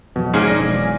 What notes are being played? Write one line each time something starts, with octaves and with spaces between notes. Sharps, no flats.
F2 B2 E3 F#3
G#2 A#3 C#4 G#4
E1 D5 A#6